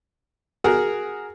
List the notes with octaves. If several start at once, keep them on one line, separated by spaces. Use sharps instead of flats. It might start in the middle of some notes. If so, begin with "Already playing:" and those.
F#4 G#4 A#4